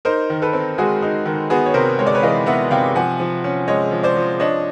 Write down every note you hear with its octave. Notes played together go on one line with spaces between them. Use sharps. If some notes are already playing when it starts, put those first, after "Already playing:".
D#4 A#4 C5
D#3
A4 B4
C4
G#3 F#4 G#4
D#4
D#3
B3 F#4 G#4
C#5
C3 A#4 C5
G#3 C#5
D5
B4 C#5
E3 D#5 F5
B3 E5 F#5
C3 F5 G5
F3 F#5 G#5
F3
C#4
G#3 C#5 D#5
F3
C5 D5
F3
D4 C#5 D#5